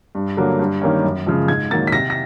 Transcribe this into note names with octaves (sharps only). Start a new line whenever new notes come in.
G2
D3 F#3 A#3
G2
D#3 G3 A#3 C#4
F#2
C#3 F3 G#3
G#2 G#6
D#3 F#3 A#3 D#4 A6
B6
C3 A#6
A#6